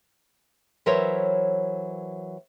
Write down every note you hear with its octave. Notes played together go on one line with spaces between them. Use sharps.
E3 F#3 A#4 C5 C#5 E5